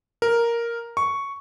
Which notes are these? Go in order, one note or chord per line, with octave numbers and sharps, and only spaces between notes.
A#4
C#6